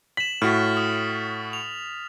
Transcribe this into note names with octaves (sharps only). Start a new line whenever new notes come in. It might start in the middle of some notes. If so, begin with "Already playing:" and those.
B6 E7 F#7
A2 F#4 F6 A6 B6
D#6
F7